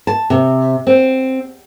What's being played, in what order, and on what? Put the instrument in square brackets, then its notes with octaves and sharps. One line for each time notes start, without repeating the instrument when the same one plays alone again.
[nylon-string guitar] A5
C3
C4